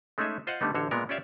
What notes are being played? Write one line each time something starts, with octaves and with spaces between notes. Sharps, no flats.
G#3 A3 C#4 D#4 G#4 E5
F4 C5 D#5 F5 F#5
D3 G3 A3 B3 D#4
A1 D3 F#4 C5 C#5
A#2 G#3 B3 A#4
C#4 F4 G4 D5 E5 F5